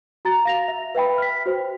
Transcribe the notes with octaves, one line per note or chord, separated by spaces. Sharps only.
F#4 A#5 A6
F5 A#6 F7
E5
B4 E5 G5 B5
F6 B6
F#4 C5